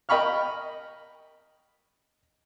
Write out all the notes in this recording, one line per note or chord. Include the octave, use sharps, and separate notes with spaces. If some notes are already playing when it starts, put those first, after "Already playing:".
A#4 D#5 G5 B5 C#6 F6